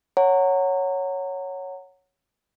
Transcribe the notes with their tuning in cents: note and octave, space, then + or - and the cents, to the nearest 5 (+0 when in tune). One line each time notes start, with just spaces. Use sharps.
C#5 +0 F#5 +0 A#5 -25